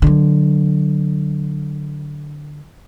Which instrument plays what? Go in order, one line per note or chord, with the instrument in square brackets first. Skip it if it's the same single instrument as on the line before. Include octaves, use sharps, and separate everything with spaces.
[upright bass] D3 F#3